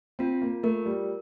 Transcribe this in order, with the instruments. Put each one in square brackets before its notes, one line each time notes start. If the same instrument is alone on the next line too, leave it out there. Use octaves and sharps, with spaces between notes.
[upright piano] C4 [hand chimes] F4
[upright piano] A#3
[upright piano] A3 [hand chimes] A#4
[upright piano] G3